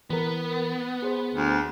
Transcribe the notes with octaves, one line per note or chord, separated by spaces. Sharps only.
E3 B3 A#4
G#4 C5
D2